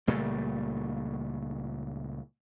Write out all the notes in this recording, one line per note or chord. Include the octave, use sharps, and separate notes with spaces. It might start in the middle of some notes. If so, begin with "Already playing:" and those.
C#2 A#2 G3 A3